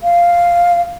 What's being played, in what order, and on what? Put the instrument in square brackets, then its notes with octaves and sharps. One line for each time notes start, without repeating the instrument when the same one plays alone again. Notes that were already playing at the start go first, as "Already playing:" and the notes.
[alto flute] F5